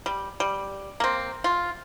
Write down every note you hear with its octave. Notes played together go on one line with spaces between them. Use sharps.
G3
G3
A#3 C4
F4